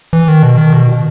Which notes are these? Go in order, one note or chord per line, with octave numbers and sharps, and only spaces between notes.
E3
D#3
B2
D#3
B2